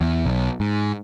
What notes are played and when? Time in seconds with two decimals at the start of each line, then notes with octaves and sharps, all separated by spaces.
0.01 E2
0.25 B1
0.60 G#2